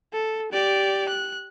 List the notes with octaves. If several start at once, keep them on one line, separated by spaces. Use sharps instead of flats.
A4
G4 D5
F#6